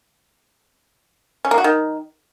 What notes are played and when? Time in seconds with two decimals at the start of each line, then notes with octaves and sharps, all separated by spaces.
1.45 C#4
1.51 A#3
1.58 F#4
1.64 D#3